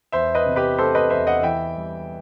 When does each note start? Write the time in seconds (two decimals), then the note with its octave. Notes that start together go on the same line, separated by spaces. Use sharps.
0.12 E2 C5 E5
0.35 B4 D#5
0.46 C3
0.56 G4 B4
0.78 A3 A4 C5
0.95 B4 D#5
1.10 E2 C5 E5
1.27 D#5 F#5
1.43 E3 E5 G5
1.77 G3